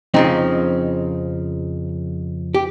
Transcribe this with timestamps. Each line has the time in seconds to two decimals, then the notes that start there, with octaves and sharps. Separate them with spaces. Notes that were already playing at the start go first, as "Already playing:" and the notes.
0.14 F2 C#3 F3 C4 D#4
2.54 G4